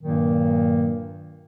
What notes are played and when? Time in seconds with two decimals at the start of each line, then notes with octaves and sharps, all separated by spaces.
0.01 G2 A#2 D#3 F#3 A#3